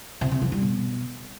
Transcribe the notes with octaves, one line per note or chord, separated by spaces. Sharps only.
C3
C3
F3
G3
B2